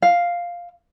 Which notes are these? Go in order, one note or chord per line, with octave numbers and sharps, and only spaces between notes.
F5